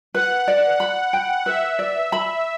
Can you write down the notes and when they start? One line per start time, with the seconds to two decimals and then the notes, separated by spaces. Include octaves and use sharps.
0.14 B4 F#5
0.48 D5
0.80 B5
1.13 G5
1.46 B4 E5
1.79 D5
2.12 B5